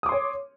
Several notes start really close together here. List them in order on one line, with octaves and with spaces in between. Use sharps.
D#6 D6 C6 C#5